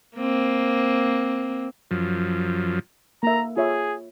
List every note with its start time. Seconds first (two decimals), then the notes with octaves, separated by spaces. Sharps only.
0.17 A#3 C4
1.91 F#2 F3
3.23 A#3 E5 A#5
3.57 F4 G#4 C#5 E5